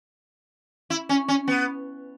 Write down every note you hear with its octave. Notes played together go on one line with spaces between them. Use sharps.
E4
C#4
C#4
B3